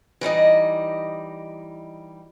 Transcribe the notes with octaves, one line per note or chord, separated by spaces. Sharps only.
E3 G3 D#4 D#5